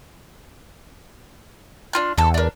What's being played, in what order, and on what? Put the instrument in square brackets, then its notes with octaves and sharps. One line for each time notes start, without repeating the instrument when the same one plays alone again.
[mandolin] D4 F4 F6
[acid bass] E2 [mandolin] A4 E6
[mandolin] D4 A#4